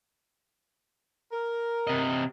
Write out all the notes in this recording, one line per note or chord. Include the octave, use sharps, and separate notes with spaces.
A#4
C3 D#5